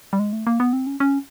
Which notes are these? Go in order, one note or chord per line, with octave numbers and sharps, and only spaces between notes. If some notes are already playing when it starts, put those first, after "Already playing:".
G3
G#3
A3
A#3
B3
C4
C#4
C#4